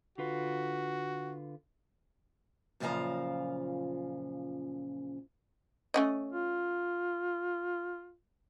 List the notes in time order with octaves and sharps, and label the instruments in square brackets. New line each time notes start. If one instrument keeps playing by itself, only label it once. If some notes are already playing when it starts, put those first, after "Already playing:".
[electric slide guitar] D3 F4 B4 [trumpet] F#4
[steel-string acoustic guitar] F#2 A#2 C#3 F3 F5 A#5
[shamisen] A3 C#4 D#5
[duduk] F4